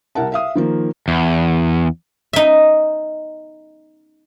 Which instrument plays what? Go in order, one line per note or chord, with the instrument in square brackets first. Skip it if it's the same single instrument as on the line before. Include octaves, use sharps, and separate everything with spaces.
[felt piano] C2 E4 A#4 F#5 A5
E5 F5 D#6
D#3 F3 A#3
[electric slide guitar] E2
[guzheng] D#4 E5